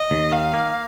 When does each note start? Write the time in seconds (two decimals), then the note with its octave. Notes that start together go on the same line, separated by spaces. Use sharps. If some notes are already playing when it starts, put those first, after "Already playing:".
Already playing: D#5
0.11 D#2
0.32 D#3 F5
0.54 A#3